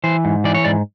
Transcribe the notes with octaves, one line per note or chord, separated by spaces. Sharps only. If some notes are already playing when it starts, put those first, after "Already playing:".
E3 C5
G#2
E3 D5
C#5
G#2 D5